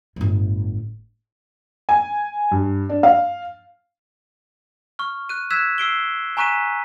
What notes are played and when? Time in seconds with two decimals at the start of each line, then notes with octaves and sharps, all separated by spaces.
0.16 G1 A2
1.89 G#5
2.51 G2
2.89 D4
3.03 F5
4.99 C#6 F6
5.29 F#6 D#7
5.50 E6 F#6 G#6 B6 E7
5.78 E6 C7 D7 G7
6.37 G#5 A#5 C#6 F#6 B6 D#7